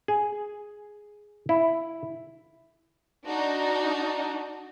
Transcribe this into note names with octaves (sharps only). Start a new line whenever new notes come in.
G#4
E4
D4 D#4 F#4